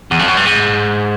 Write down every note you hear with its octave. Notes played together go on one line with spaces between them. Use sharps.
E2
F2
F#2
G2
G#2